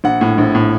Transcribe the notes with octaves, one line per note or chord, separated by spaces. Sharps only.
A#1 F#5
A2
A#1
A2